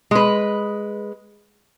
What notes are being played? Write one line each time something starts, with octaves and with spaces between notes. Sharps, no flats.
G#3 B4